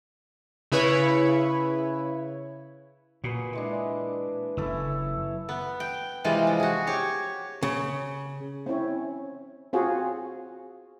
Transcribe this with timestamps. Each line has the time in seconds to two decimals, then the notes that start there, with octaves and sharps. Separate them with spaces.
0.72 C#3 E4 B4 C#5
3.24 A#2 F#3 G#4 B4
3.53 E3 G#3 D4
4.57 F#1 C#4 E4 A4
5.49 B3
5.80 G5
6.24 C3 E3 G3 G#3 F4
6.47 F3
6.60 F#4 G#4
6.87 G4 C#5
7.63 C#3
8.66 C4 C#4 E4 C#5
9.73 C4 F4 F#4 G#4 C5